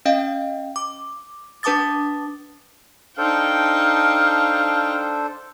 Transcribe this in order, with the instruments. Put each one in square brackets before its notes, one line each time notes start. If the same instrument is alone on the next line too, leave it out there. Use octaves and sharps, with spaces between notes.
[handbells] C#4 D#5 F5 G5
D6
D4 B4 A5 D6 D#6 A6
[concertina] D4 A4 C5 [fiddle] D#4 G5 [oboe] F5